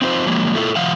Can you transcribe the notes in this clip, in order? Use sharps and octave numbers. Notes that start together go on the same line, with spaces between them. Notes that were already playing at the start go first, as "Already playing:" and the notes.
C4 D#4 F4 B4 C5
F3 F#3 G#3 A#3
A3 E4 F4 A4
D#3 F3 F5 F#5